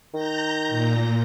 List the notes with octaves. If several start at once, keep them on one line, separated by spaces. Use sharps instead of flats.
D#3 A#5 G6 A#6
A#2